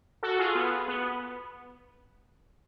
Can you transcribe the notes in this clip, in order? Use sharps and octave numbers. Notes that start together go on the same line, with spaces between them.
F#4 A4
F4 G#4
B3
B3